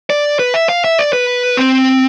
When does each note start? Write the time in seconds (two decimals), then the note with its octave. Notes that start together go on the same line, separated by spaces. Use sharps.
0.10 D5
0.39 B4
0.54 E5
0.69 F5
0.84 E5
0.99 D5
1.13 B4
1.57 C4